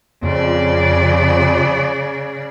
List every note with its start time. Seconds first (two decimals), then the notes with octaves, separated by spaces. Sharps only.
0.23 F2 C#3 D5